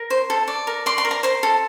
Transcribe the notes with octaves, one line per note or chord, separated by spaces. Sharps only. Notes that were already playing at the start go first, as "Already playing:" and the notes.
Already playing: A#4
C5
A4
D5
A#4
D5 C6
C6
A#4
A#5
C5 C6
A4